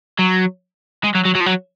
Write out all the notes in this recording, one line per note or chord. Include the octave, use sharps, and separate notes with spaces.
F#3
G#3
F#3
F#3
F#3
F3
F#3